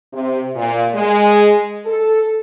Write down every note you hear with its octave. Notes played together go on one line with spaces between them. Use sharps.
C3
A#2
G#3
A4